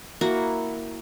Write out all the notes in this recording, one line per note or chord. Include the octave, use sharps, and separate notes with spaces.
A#3 E4 F#4